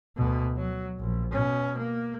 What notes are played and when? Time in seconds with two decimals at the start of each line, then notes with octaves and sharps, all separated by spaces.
0.17 D2 B2
0.57 F#3
0.99 A#1
1.32 B2 C#4
1.78 A#3